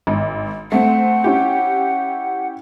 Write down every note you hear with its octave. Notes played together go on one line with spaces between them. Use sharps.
G#1
A3 C4 F#5
C#4 E4 G4